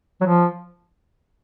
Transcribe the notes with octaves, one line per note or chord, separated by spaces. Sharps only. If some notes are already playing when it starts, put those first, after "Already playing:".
F#3
F3